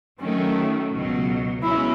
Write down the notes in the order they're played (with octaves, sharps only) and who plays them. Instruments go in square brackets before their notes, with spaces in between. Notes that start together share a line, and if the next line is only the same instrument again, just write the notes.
[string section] D#3 F#3 A3 [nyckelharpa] C#4
[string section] C#2 B2 F#3
[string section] B2 G#3 C#4 [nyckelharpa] E4